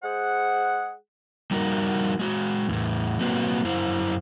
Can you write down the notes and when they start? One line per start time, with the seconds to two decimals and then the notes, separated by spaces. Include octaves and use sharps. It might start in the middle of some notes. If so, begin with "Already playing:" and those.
0.03 G#3 G#4 C5 F#5
1.51 G3 D#4 F#4 A#4
2.19 G#3 F#4
2.69 E2 A2
3.19 F#3 A#3 C4 F#4 B4
3.65 F#2 E4 C5